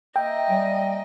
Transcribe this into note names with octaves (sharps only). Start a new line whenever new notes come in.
A#3 D#5 E5 G5
G3 G#5